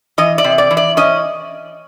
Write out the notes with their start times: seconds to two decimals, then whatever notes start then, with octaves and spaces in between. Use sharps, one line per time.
0.18 E3 D#5
0.38 D5
0.44 C3
0.58 D5
0.71 E3
0.77 D5
0.97 C#4 D#5